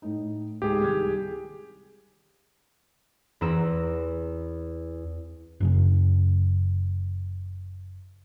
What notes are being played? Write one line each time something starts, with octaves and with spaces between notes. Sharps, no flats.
A2 D#4
C#2 G#2 G4 G#4
C2 D#3 G#6
E2 C4 B4 A#5 E6 E7
F#1 F#2 C#3